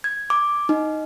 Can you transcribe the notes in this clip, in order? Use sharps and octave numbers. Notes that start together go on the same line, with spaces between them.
G#6
D6
D#4